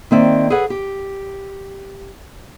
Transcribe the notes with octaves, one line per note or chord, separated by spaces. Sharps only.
D#3 A#3 C4 D5 E5
G#4 A4 B4 C#5 F#5
G4